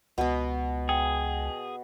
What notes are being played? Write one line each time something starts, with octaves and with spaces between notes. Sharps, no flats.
C#2 B2 B3
G#4 G5